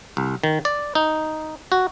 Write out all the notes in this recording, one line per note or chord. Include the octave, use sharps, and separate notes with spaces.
C2
D#3
D5
D#4
F#4